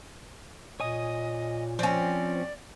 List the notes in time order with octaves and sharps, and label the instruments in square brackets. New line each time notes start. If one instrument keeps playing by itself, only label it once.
[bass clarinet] A#2 [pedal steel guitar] C#5 G#5 D#6 [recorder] D#5
[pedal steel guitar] F3 [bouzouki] C4 C#4 [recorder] D5